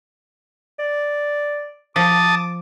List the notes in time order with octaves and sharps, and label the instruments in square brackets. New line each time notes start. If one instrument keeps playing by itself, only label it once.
[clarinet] D5
[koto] F3 [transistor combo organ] A5 D#6 [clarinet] D6